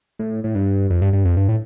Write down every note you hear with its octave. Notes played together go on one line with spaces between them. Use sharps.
A2
A2
G2
F2
G2
G2
F2
G2
A2